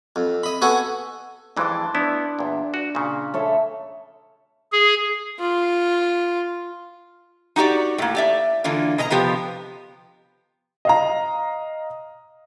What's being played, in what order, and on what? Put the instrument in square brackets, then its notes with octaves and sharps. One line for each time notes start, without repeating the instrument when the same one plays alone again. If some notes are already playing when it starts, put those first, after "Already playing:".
[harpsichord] F2
D#5 B5
B3 F#4 A4 G#5
[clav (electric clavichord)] F2 E3 G#3 [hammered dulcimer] A5 C6 D6
[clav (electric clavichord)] B3 E4 [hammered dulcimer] D4
[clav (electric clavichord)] E2 A#2
F#4
A#2 C#3
[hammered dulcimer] A4 C#5 E5
[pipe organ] G#4
[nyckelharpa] F4
[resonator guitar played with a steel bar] D#4 F#4 G4 D5
A2 A#3
G4 D5 E5
D3 E3 A#3 F4
B2 D#5 A#5
C3 F3 B3 G4
[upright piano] D#5 F5 A#5